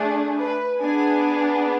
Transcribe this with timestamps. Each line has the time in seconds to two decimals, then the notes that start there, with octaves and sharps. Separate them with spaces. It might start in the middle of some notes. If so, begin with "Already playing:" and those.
Already playing: A3 D4 G#4
0.39 B4
0.80 B3 D4 G#4 G#5